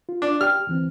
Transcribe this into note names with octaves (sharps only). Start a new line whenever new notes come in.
F4
D4
G4 G5 F6
D2 E3 C4